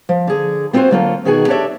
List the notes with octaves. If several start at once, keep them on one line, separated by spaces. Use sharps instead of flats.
F3
D3 G#4
B3 C4 F4 F#4 C5 G#5
D3 F#3 A#3 F4 A4
B2 D#3 F#4 G#4 G#5
D4 G4 A4 C#5 D5 E5